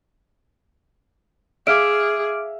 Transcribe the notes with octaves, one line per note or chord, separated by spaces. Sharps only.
G#4 E5 F5 D6 F6 D7